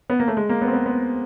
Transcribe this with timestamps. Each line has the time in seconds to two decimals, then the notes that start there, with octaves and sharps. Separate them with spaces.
0.10 B3
0.20 A#3
0.28 A3
0.37 G#3
0.49 A#3
0.62 B3
0.67 C4
0.73 B3
0.86 B3